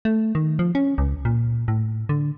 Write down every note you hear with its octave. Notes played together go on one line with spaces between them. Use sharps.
A3
D#3
F3
C#4
C#2
A#2
A2
D3